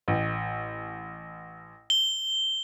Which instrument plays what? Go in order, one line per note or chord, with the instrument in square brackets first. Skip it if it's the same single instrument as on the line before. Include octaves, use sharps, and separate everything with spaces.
[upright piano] A1
[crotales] G7